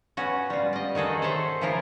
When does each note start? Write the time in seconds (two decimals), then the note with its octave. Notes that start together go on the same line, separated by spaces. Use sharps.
0.17 B3 C#4 F#4
0.50 G3 F4
0.73 D5 D#5
0.95 D#3 F#4 G#4 A4
1.22 A4 C5 C#5 E5 F#5
1.61 C#3 F3 E4 F4 A#4